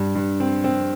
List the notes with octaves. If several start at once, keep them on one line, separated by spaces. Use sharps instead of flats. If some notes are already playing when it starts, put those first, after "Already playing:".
Already playing: G2
G2
C4
C4